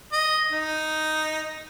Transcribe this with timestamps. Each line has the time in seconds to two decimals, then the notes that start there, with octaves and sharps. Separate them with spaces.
0.12 D#5
0.52 D#4